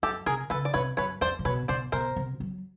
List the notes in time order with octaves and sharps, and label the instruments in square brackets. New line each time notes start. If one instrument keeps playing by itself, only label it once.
[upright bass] F#2 [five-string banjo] G4 A4
[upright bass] C3 [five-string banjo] G#4 A#4
[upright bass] C#3 [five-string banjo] A4 B4
[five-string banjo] D5
[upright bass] C3 [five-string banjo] B4 C#5
[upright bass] F#2 [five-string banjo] B4 C#5
[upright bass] F2 [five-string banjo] C5 D5
[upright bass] A#2
[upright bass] B2 [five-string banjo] B4 C#5
[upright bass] B2 [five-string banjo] C5 D5
[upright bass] B2 [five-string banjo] A#4 C5
[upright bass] C3
F#3